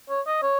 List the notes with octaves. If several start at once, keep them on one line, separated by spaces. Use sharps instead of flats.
C#5
D#5
C#5